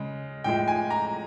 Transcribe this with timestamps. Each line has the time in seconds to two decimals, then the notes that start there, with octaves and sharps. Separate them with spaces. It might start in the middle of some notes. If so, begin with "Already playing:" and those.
Already playing: C#3 G#3
0.44 A2 F3 G#3 G5
0.68 G#5
0.90 A#5